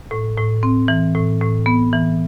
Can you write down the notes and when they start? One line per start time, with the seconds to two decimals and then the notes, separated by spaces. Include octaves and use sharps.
0.11 A2
0.37 A2
0.63 C4
0.88 E3
1.15 A2
1.41 A2
1.66 B3
1.93 E3